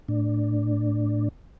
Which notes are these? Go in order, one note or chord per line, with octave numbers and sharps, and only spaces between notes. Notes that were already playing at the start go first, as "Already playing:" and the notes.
A2 D4